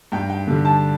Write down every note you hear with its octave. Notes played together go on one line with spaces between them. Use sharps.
G2 G5
G5
D3 G3
A5